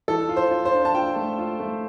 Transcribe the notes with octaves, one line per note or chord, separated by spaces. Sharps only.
E3 A4
F4
C5
F4
C5
D4
A5
F4 G5
A3
F4
A3